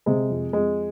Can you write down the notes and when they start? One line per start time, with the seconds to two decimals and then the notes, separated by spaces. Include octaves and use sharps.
0.06 C3 G#3
0.30 F2
0.53 F2 G#3